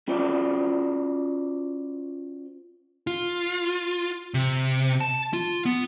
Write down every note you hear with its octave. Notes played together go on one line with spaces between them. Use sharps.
C#4 F4 F#4 C5 D5
F4
C3
A5
F4
B3